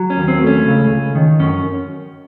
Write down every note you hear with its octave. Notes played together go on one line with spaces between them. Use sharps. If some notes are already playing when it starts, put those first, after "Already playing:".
Already playing: F#3
C#4
D#2
C4
A3
C#4
C#2
C#2
D#3
F#2 C#4